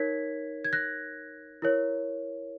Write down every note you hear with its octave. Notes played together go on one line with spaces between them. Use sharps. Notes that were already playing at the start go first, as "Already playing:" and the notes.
Already playing: D#4 A#4 C#5 G#6 B6
G#6
F#6 A#6
E4 A#4 C#5